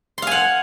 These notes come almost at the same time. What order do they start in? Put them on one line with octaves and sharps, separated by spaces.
C6 F5 G#5 F#5